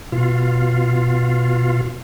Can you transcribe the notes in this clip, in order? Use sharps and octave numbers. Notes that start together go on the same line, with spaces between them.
B2 F4